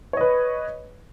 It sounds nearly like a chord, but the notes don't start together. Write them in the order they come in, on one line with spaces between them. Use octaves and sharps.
C#5 D#5 B4